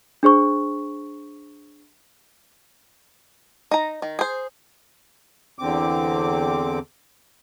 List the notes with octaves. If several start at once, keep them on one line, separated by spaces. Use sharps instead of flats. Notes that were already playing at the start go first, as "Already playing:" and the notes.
D4 G#4 C5 C#6
D#4 A#5
D#3
G#4 C5
E2 D3 C4 D6